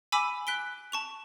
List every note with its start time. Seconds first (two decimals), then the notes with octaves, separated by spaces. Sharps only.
0.12 G#5 B5 D6 E6 B6 D#7
0.47 F#6 B6 D7 G7
0.92 A5 C#6 F7